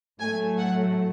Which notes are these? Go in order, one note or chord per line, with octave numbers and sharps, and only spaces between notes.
A2 F#3 A3 G#5
F#5